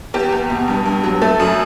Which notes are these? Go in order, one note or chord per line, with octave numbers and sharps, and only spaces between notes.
E2 G4
E2
B2
G2
G2
F#3
A3 A4
F#2